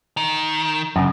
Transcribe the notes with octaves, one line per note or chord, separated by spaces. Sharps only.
D#3
F#2 C#3